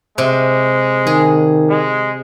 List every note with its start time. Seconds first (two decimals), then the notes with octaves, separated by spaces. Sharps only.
0.18 C3 G#3
1.07 D#3 G#4
1.69 G#3